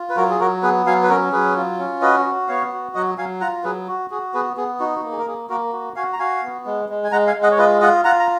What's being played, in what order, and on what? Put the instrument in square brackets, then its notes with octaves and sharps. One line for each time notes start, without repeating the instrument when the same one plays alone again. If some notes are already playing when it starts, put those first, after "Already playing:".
Already playing: [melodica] F4
B4
F#3 F#4 A#4
G#4
F#3 F#4 A#4
B3 G#4 B4
F#3 F5 G#5
B4
C#4 F#4 A#4
F#3 G#4 B4
F4
C#4
F#4 B4 D#5
F#4
B3 C#5 F5
F#4
F#3 D#5 F#5
F#3 F5 G#5
F4 F#5 A#5
F#3 G#4 B4
F#4
F#4 G#4
B3 G#4 B4
B3 G#4
D#4 F#4
F#4
A#3
G#4
A#4
A#3 G#4
A#3 F#4 A#4
F#4
F#4 F5 G#5
A#5
F#4 F5 G#5
B3
G#3
G#3
G#5
G#3 F#5 A#5
F5 G#5
G#3
D#5 F#5
C#5
F4 B4 D#5
F4 D#5 F#5
F4 F#5 A#5
A#5